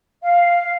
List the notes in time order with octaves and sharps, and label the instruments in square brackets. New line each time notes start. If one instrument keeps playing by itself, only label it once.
[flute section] F5